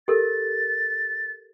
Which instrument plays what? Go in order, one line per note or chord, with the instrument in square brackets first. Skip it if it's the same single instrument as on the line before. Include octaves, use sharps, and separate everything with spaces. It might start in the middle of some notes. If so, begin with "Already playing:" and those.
[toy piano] G4 A4 A#4 [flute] A6